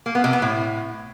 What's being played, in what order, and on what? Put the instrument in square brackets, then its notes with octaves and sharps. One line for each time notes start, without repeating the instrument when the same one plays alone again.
[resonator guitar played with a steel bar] A#3
B3
C3
B3
A2